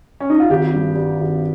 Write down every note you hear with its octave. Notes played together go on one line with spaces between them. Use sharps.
C#4
D#4
F4
G#1 G4
G2
G3
G#1